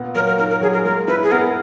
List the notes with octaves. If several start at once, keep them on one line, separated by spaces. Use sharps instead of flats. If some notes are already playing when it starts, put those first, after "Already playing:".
Already playing: A#2 B3
F#3 A#4
A#4
D#4 A#4
A#4
F#3 G#4
A#4
G#3 A#4
E4 B4
G#4
B3 A#4